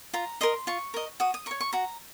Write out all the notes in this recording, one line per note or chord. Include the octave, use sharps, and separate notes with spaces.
F4 A#5
A#4 D#5 C6
F4 C#6
A#4 D#5
F#4 D#6
D#6
A#4 C#5 C#6
C#6
F#4 A#5